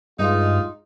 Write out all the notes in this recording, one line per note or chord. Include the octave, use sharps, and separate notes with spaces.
G2 G#3 D#4 F4